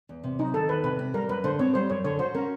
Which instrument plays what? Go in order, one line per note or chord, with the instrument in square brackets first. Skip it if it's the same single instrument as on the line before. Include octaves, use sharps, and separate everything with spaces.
[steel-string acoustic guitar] E2
C3
[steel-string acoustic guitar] F#3 [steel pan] D#4
[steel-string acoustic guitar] D#3 [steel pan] A4
[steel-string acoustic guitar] E2 [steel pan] B4
[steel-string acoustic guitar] C3 [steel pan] B4
[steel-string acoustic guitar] C4
[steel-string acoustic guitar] G3 [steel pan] A#4
[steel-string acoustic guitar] F#2 [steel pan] B4
[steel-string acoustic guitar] D3 [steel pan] C5
[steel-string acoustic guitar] C4 [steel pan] C#5
[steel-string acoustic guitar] G3 [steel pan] C5
[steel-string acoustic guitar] F#2 [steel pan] C#5
[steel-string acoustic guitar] D3 [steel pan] C#5
[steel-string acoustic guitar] F#4 [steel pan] C5
[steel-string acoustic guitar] C#4 [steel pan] A#4